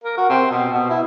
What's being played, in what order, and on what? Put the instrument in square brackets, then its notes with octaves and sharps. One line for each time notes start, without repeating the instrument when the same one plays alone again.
[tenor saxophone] A#4
F#4
C4
B2
B2
E4